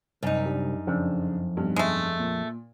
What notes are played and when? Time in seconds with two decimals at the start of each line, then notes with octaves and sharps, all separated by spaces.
0.23 C2 F#2 D#4
0.46 G3 D4
0.87 F2 C#3 D4
1.57 B1 G2
1.76 G#3 A3
2.19 A#2